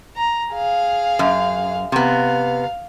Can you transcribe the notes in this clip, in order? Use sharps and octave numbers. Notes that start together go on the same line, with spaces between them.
A#5
G#4 F5
F#2
C3 B3 F5